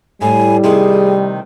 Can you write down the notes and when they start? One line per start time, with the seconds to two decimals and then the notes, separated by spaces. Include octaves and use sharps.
0.21 A2 G3 G#5
0.64 C3 D#3 A3 G#4